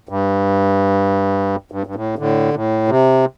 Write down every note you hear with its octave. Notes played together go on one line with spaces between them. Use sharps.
G2
G2
G2
A2
A2 D3
A2
C3